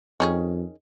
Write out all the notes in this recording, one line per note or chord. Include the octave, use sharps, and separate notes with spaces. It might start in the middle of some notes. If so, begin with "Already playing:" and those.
F2 D#3 C#4 G#4